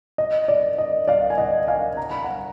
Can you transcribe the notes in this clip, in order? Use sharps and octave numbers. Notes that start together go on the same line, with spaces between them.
D#5
D5
D#5
D5 F5
G#5
D#5 F#5
F5 G#5
A#5
B5
F#5 A#5